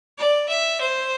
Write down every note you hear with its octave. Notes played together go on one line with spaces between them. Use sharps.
D5
E5
C5